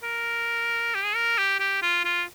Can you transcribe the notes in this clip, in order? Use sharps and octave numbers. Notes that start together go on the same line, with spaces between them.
A#4
G4
G#4
A#4
G4
G4
F4
F4